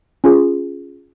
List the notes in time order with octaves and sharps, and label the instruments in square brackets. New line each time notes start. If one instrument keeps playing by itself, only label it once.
[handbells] C#4 F4 G#4